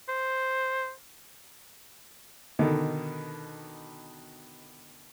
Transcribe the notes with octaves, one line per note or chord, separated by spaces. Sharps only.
C5
B2 D3 D#3